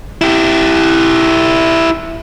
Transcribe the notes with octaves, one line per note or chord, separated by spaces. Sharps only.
E4 G4